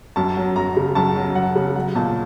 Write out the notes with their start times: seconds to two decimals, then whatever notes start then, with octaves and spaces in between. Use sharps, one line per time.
0.16 F#2 A5
0.37 F#3
0.56 F#2 A#5
0.77 C#3
0.95 F#2 A5
1.16 F#3
1.35 F#2 F#5
1.55 C#3
1.76 F#3 F#5
1.95 A#2 A5